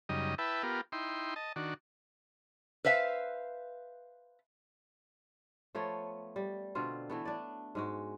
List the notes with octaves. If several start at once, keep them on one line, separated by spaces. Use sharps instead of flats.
F#2 C#3 G3 D#4 D#5
E4 B4 E5 G5 A5
B3 F4 G4 A#4
D#4 E4 G5 C6
D#5 A5
D#3 D4 F#4
B4 C5 E5 F5
F3 A3 B3 C#5
G3
B2 D3 C4 F4
E3 A3 B3
D4 D5
G#2 G#3 F#4